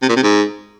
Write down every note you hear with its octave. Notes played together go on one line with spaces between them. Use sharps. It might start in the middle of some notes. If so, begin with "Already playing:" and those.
C3
A#2
C3
G#2